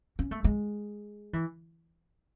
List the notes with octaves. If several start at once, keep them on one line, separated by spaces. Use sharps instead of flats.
C#4
A3
G#3
E3